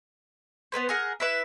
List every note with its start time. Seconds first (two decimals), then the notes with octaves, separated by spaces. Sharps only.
0.72 B3 C4 B4 C5
0.89 G#4 A#4 F#5
1.20 E4 B4 E5